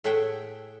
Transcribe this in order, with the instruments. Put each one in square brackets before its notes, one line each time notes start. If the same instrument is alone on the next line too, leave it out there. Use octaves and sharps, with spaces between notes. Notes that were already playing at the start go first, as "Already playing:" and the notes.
[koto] A2 A3 G#4 E5 F#5 G5